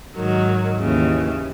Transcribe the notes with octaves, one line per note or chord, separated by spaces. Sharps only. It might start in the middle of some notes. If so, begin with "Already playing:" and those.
G#2 D#3 F#3
D#2 C#3 E3